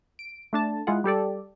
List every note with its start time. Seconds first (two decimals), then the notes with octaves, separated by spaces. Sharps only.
0.19 D7
0.53 A3 D4 A5
0.87 G#3 E4 F4 G#4 F#5
1.04 G3 G4 A4 D5